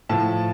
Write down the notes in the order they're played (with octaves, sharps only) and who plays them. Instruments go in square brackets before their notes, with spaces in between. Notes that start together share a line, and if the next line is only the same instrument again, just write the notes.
[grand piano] A2 F3 A5